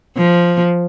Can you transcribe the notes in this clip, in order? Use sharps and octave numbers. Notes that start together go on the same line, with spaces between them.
F3